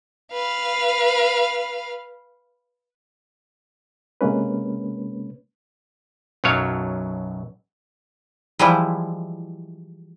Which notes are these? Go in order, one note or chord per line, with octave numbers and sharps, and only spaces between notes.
B4 F5
C3 G#3 A#3 C#4 B4
B1 F#2 F#3 C#5 F5
E3 F3 G3 G#3 E4